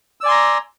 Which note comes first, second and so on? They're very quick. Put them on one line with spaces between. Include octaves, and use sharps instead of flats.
E6 D5 G#5 C6 A#5